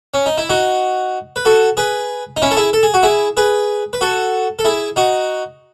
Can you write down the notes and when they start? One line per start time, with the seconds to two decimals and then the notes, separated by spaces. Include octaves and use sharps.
0.14 C#4
0.26 D#4
0.38 E4
0.50 D#4 F#4
1.36 B4
1.45 F#4 A4
1.77 G#4 B4
2.37 D#4
2.42 C#4 E4
2.51 A4
2.57 E4 G#4
2.73 A4
2.83 G#4
2.94 F#4
3.03 E4 G#4
3.37 G#4 B4
3.93 B4
4.01 F#4 A4
4.59 A4
4.65 E4 G#4
4.96 D#4 F#4